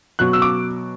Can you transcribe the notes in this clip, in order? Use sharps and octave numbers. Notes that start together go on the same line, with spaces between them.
B2 F#3 F#6
E6
D6